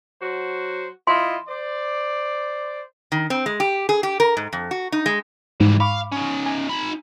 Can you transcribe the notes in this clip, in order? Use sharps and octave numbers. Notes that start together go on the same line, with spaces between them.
F#3 F#4 C5
E4 F4 D#5 C6
C5 D5
D#3
C4
G#3
G4
G#4
G4
A#4
G#2
F2
F#4
D#4
G#3
G#2 E3 G3
F5 B5 C#6 D6
C#4 D#4
G#5
D#4 B5